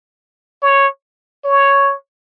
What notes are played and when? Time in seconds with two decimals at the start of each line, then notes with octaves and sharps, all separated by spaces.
0.62 C#5
1.45 C#5